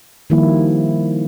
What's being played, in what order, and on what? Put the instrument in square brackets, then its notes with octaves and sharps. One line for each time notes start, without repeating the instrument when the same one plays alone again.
[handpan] D#3 F3 G3 A#3 E4